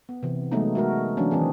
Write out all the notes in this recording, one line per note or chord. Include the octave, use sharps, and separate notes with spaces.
B3
C3 E3
F#3 G#3 A3 B3 D#4
G#3 F#4 A#4
E3 F#3 A#3 C#4 D4
D#3 E3 C4 G#4